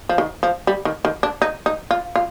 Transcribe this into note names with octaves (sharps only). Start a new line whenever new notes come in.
F3
D#3
F3
G3
D#3
D#3
D4
D#4
D#4
F4
F4